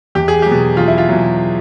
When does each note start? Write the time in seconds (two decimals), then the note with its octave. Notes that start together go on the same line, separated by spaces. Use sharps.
0.15 E2 G4
0.28 G#4
0.42 F#3 G4
0.51 B2
0.77 E2 F4
0.88 E4
0.98 F4
1.09 B2 F#3